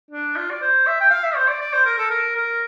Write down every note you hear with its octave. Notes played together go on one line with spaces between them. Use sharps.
D4
F4
D5
C5
E5
G5
F5
E5
C5
D5
D5
C5
A#4
A4
A#4
A#4